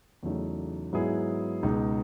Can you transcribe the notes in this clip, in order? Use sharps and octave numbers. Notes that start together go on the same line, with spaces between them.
E2 C#3 F#3 A3 D#4
G#2 F#3 B3 E4 G#4
C#2 B2 G#3 D#4